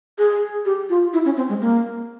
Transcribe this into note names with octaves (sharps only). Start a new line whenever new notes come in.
G#4
G4
F4
E4
C#4
C4
G#3
A#3